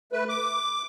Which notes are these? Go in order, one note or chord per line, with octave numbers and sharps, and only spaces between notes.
A3 B4
D6